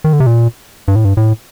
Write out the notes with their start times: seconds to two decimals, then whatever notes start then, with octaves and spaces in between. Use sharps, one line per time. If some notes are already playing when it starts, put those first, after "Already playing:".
0.04 D#3
0.13 D3
0.20 C3
0.27 A#2
0.88 G2
0.96 A2
1.05 G2
1.17 A2